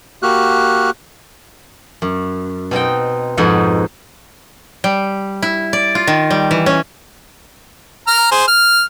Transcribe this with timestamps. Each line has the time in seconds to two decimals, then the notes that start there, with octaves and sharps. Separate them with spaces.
0.23 A#3 F#4 G4 F6 F#6
2.02 F#2
2.71 B2 C4 D#4 G5
3.37 F2 G#2 B2 D#4 F#5
4.84 G3
5.42 E4
5.73 D5
5.95 F4
6.07 D#3
6.30 G3
6.51 E3
6.66 C#4
8.07 A#5 F6
8.31 G#4 C5
8.48 F6